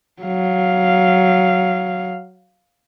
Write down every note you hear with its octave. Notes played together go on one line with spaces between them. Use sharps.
F#3 F5